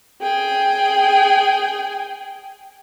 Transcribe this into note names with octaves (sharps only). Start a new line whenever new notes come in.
G#4 G5